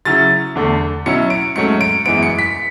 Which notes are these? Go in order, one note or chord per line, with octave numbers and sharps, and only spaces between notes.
C#3 F#3 C#4 E4 A6
E2 D3 A3
B2 F#3 C#4 E4 C#7
D7
G#2 F#3 A3 C#4 C#7
D7
F#2 E3 G#3 B3 D7
C#7
B6